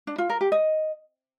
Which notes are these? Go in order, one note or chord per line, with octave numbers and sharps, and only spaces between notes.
D4
F4
A#4
G4
D#5